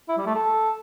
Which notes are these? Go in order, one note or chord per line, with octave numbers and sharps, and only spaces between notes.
E4
G3
A3
A4